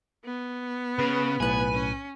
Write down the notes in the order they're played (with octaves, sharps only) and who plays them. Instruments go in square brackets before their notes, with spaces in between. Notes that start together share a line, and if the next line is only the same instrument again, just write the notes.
[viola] B3
[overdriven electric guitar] C#3 [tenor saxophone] B4
[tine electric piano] B1 A2 F#6 [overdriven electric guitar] G#5
[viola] C#4